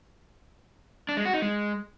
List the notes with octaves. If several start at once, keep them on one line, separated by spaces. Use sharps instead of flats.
D4
G#3
F#4
D#4
G#3